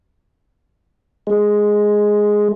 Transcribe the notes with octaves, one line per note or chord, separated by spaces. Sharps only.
G#3